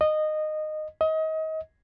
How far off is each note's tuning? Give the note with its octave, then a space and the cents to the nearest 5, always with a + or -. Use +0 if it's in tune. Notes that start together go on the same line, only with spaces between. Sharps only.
D#5 -15
D#5 +30